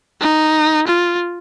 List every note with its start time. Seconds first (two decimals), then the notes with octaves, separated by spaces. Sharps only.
0.21 D#4
0.87 F4